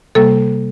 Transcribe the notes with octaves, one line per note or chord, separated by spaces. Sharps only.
C3 G3 A#3 A4